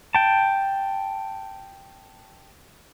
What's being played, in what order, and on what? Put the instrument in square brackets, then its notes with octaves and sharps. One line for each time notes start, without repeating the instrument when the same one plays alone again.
[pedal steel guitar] G5 A5